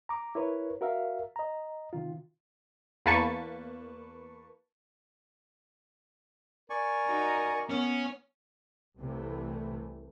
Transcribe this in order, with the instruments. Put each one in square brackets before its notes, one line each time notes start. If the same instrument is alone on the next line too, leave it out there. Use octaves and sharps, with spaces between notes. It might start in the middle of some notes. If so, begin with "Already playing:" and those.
[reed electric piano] A#5 D6
E4 A#4 B4 C#5
F#4 A#4 E5 F5
D#5 A#5
C3 D#3 F4
[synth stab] E2 A#3 B4 A5 C#6 C#7
[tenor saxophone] A#4 [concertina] D5 G#5 C#6
[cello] D#4 F#4
[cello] B3 [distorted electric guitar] C#4
[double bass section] C2 C3 E3 A3